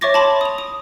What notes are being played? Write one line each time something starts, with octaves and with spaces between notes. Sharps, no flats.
C#5 E5 C#6 D6 A6 A#6
A5 B5 C6 D6
D#6 F7
D#6